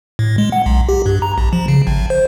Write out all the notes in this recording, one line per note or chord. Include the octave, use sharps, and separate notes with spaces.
A2
G#3
F#5
B1
G4
G2
A#5
A#1
F3
C#3
G#1
C5